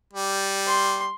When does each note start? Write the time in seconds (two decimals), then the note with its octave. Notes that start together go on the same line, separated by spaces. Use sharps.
0.13 G3
0.66 C6